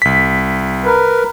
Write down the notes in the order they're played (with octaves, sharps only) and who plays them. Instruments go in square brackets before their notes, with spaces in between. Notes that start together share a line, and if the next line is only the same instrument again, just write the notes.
[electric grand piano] C2 B6
[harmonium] A#4 B4